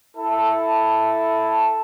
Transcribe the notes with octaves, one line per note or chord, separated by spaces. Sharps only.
E4 A4 A5